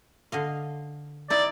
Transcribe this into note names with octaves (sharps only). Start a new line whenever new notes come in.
D3 D#5 F5
D#4 E4 D5